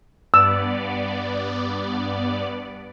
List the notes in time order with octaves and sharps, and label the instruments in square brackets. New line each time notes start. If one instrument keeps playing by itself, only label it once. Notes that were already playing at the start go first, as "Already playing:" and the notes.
[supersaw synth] G2 B3 D5 [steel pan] E6